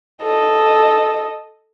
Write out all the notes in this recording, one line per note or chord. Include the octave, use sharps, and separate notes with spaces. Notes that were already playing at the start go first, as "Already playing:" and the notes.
A4 D#5